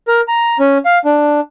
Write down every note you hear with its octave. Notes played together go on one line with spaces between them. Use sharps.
A#4
A#5
C#4
F5
D4